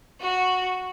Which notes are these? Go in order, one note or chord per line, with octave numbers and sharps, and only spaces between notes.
F#4